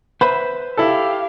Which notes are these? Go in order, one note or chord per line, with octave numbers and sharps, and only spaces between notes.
B4 C5 E5 B5
E4 G4 A4 F5